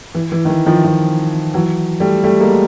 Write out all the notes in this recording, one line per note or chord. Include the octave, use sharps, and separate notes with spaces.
E3
E3
D#3
E3
D#3 F3
D#3 F3
E3 F#3
G3 A3
G3 A3
G#3 A#3